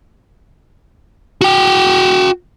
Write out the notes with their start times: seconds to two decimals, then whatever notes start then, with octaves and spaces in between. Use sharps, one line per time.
1.41 F#4 G5